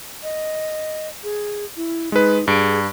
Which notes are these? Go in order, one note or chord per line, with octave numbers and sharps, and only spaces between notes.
D#5
G#4
E4
G#3 D#4 B4
G2 G#4 D7